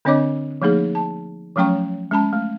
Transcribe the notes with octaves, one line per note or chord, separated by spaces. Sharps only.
D3 C4 D4 C#5 D#5 D6
F3 A3 A#3 D#4 G#4
A5
F3 F#3 A3 C#4 G5 C#6
G#3 C#4 A5 B5
A3